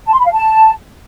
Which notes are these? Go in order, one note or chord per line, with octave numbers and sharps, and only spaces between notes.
A5
C6
B5
F5
A5